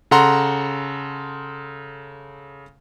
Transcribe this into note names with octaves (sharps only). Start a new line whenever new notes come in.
C#3 A4 F#5 A#5 C6